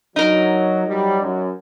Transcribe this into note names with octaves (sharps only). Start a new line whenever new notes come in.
F#3 D#4 A#4
F#3 G3
F#2